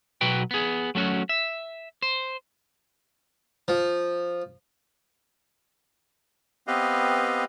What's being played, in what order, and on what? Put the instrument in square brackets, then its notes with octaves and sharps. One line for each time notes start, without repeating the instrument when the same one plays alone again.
[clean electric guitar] B1 B2 F#3 F#4 B4 G5
B3 G#4
F#3 A3 C#4 F#4
E5
C5
[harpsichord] F3
[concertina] B3 C4 G4 B4 D#5 F5